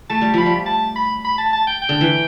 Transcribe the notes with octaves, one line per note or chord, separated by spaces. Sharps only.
A3 A5
G3
F3 B5
G3
A5
B5
B5
A5
A5
G5
G5
D3
E3